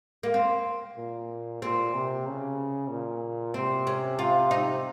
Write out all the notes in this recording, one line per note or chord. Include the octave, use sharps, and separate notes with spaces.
A#3
C4
A#2
A#2 C4
C3
C#3
A#2
C3 C4
C#4
F4
D#4